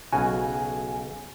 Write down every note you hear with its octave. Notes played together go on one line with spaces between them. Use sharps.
B1 C#3 F#4 G#5